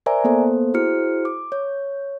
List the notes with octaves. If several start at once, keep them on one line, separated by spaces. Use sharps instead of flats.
A#4 C5 D5 E5 G#5 A#5
A#3 B3 A4 C5
E4 F#4 G#4 C5 F6 C#7
D6
C#5